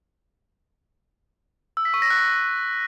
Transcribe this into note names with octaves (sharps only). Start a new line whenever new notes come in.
E6
B6
C#6
A#6
F#6